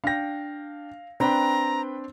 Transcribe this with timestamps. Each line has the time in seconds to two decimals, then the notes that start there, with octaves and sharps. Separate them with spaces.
0.04 D4 F5 G5 A#6
1.20 C4 D4 B4 G5 A#5 B5